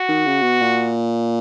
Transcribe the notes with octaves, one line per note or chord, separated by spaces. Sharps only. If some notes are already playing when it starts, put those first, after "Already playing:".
Already playing: F#4
D#3
C#3
B2
A#2